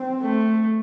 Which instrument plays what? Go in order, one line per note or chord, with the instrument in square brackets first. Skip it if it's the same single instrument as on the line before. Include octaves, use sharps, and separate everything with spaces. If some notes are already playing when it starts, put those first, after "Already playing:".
Already playing: [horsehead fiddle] C4
[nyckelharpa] A3